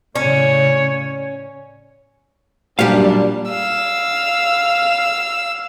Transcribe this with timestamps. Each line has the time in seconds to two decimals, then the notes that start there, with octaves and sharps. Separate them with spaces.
0.16 A2 C#3 C#4 C#5 D5
2.79 F#2 A#2 G3 D4 G4 F5
3.50 F5 E6